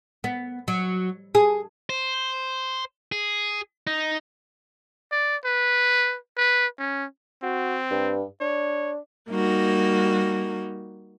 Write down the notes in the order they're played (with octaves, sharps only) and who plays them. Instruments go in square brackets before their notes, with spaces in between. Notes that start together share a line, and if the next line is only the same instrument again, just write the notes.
[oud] B3
F#3
G#4
[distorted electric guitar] C5
G#4
D#4
[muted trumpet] D5
B4
B4
C#4
[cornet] C4 [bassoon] F#4
[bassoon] G2
[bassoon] D4 [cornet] C#5
[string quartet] G3 A#3 D#4 F#4